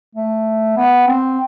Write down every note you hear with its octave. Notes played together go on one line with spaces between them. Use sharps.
A3
B3
C4